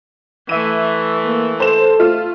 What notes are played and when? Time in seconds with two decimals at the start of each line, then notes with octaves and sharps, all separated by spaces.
0.49 E3 A3 E5 D#7
1.25 A#3
1.60 A4 C5 E7
1.99 A3 F4